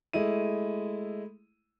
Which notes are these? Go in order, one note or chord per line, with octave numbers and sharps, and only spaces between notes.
G#3 A3 E4 D#7